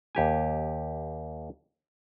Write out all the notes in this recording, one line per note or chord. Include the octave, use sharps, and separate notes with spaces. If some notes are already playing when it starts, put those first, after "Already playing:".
D#2 G4 G#5